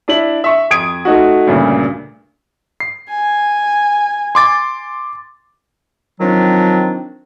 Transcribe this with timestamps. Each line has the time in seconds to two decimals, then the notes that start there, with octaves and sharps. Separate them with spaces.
0.08 D4 E4 F#7
0.44 E5 C#6
0.70 F2 D#6 G#6 D7
1.05 A3 D#4 F#4
1.47 D2 G2 A#2 C#3
2.80 C7
3.09 G#5
4.35 C6 D6 A6
6.20 D#3 F3 F#3 C4 D4